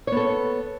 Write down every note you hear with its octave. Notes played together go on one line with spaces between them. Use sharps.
B3 A4 C#5